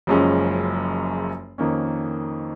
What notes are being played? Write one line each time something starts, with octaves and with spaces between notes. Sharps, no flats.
F#1 F#2 F3 G#3 C#4
F2 D#3 A#3 C#4